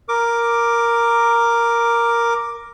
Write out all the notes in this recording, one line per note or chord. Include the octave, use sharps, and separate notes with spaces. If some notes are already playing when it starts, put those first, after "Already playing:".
A#4 D6